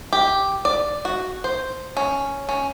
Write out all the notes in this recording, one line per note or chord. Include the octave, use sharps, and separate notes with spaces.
G4
D5
F#4
C5
C#4
C#4